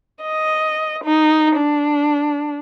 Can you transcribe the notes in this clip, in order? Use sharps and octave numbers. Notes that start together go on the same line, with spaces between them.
D#5
D#4
D4